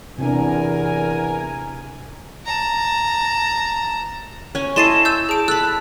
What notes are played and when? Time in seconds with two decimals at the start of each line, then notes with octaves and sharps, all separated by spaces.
0.18 E2 C3 D4 A#4 G#5
2.45 A5 A#5
4.55 C#4 G#5
4.76 E4 A4 D#5 C6 A6 C7 E7
5.05 E6 G6
5.29 G#4 A5 D7
5.48 A4 B5 E6 F#6